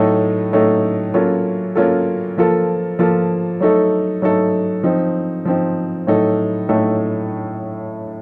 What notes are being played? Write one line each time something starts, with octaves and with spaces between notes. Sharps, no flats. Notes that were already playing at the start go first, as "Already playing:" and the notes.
Already playing: A2 F#3 A3 D#4 A4
A2 F#3 A3 D#4 A4
F#3 A#3 C#4 F4 A4
F#3 A#3 C#4 F4 A4
F3 A#3 F4 A4
F3 A#3 F4 A4
F#3 A3 D#4 A4
F#3 A3 D#4 A4
F3 C4 D#4
F3 C4 D#4
A2 F#3 A3 D#4 A4
A2 F#3 A3 D#4 A4